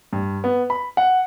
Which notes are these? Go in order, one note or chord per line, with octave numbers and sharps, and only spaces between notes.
G2
B3
B5
F#5